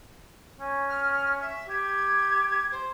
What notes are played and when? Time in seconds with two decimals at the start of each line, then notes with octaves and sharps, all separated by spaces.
0.60 C#4
0.89 F6
1.40 E5
1.68 G4 G#6
2.71 C5